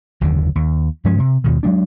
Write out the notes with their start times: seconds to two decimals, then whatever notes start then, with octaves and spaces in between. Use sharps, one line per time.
0.21 F#1 D#2 D3 D#3
0.55 D#2
1.04 G2 F3 G#3 C#4
1.19 C3
1.44 D#2 B2 D#3
1.63 F#3 G#3 D4